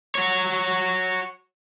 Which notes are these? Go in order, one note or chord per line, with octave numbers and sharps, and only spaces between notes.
F#4 C#5